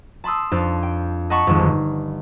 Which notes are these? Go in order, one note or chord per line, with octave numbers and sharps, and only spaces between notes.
A5 B5 C6 D#6 E6
F2 D4 C5 F5
G5
D#5 F#5 A5 B5 C#6
G#1 F2
G1